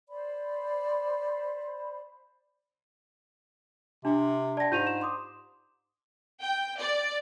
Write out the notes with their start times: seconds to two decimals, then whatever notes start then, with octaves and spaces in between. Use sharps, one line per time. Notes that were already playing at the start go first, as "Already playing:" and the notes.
0.09 C5 D5 B5
4.05 C3 D4
4.57 D5 G5 A5 A#6
4.72 G#2 F4 G4 G6 D#7 F7
4.87 E7
5.01 C6 D6 D#6
6.42 G5
6.80 D5